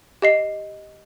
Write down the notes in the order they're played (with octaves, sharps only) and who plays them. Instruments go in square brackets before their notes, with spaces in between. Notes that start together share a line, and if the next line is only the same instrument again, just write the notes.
[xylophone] G4 D#5 C7